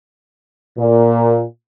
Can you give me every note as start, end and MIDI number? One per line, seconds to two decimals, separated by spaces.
0.76 1.40 46